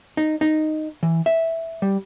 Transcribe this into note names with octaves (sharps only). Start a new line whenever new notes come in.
D#4
D#4
E3
E5
G3